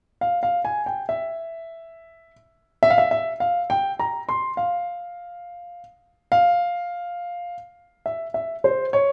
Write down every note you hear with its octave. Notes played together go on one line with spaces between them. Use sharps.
F5
F5
G#5
G5
E5
E5
F5
E5
E5
F5
G5
A#5
C6
F5
F5
E5
E5
C5
C#5